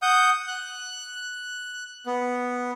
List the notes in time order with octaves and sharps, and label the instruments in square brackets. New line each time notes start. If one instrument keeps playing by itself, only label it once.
[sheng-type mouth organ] F#5 D#6 G6
F#6
B3